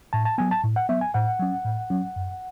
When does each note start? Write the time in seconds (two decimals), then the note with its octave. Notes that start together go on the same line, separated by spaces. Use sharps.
0.13 A2 A5
0.25 A5
0.38 F#3 B3 G#5
0.51 A5
0.63 A2
0.76 F#5
0.89 F#3 B3 E5
1.01 G#5
1.14 A2 F#5
1.39 F#3 C#4
1.65 A2
1.90 F#3 C#4
2.16 F#2